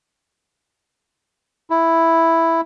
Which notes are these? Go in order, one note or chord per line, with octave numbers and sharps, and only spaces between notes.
E4